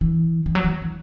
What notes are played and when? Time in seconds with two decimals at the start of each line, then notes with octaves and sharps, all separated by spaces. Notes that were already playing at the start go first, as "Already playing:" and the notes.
0.01 E3
0.46 E3
0.55 F#3
0.64 E3
0.82 E3